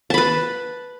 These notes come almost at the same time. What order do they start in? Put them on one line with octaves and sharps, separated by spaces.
A5 B5 B4